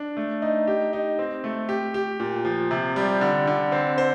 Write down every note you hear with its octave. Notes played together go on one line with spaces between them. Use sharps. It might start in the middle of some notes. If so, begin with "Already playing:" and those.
Already playing: D4
A3
D#4
G4
D#4
C4
A3
G4
G4
A#2
F3
C3
G3
D3
D3
C4
C5